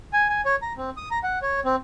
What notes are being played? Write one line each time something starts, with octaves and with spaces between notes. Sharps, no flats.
G#5
G#5
C#5
A#5
C4
D#6
A#5
F#5
C#5
C4